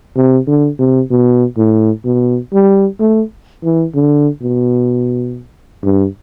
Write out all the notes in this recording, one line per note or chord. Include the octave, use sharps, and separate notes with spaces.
C3
D3
C3
B2
A2
B2
G3
A3
E3
D3
B2
G2